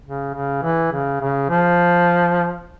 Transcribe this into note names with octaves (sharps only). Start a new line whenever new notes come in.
C#3
C#3
E3
C#3
C#3
F3